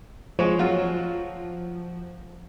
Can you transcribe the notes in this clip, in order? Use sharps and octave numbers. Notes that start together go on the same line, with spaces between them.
F3 G#3 C#5
F#3 F4 F#4